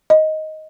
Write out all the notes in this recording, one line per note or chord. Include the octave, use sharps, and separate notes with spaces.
D#5